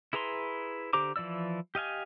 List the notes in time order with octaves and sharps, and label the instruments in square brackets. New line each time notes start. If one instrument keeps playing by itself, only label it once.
[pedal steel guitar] E4 G#4 B4 A#5 C6
D3 G4 C5 A#5 D6
E3 F3 E4 D5 E6
G4 D#5 F5 G#5